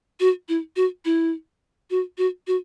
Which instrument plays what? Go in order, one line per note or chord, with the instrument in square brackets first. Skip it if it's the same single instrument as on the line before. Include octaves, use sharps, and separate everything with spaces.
[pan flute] F#4
E4
F#4
E4
F#4
F#4
F#4